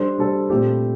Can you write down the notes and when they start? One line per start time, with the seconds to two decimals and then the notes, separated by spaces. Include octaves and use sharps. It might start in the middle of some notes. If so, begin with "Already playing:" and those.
Already playing: G3 D4 A4 C5
0.18 G3 D4 A4 C5
0.50 A#2 A3 C4 E4 G4